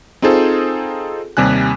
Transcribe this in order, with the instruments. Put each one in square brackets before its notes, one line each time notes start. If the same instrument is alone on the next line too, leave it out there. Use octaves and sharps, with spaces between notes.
[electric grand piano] C4 D#4 F4 G#4 A4 C5
D#2 C3 G3 G#5 F#6